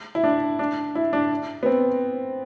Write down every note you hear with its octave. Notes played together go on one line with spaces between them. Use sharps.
E4
D4
D4
E4
D4
B3
C4